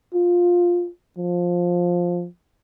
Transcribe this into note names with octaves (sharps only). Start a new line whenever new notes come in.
F4
F3